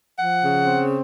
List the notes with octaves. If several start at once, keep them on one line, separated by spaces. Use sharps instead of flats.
F3 F#5
C#3
C4